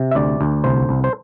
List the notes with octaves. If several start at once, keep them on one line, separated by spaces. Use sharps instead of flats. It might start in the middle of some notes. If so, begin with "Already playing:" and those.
Already playing: C3
E5
D2 D5
D2
C2 C5
C2
C5